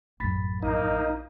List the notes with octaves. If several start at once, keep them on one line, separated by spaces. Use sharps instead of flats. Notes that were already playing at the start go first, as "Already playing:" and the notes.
A1 F#2 B5 A6 B6
A#1 A#3 D#4